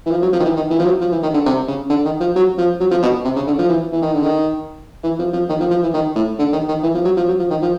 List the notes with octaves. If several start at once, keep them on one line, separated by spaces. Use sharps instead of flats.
E3
F3
F#3
F3
D#3
E3
D#3
E3
F3
F#3
F3
E3
D#3
D3
C3
C#3
D3
D#3
F3
F#3
F3
F#3
F3
B2
C3
C#3
D3
F3
E3
E3
D#3
D3
D#3
E3
F3
F3
D#3
F3
F3
E3
D#3
A2
D3
D#3
D#3
E3
F3
F#3
F3
F#3
F3
D#3
F3